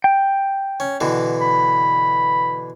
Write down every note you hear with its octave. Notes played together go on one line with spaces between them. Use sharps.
G5
C#4
B2 D3 E3
B5